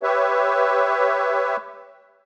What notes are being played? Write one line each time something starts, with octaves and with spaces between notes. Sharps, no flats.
G4 B4 C#5 E5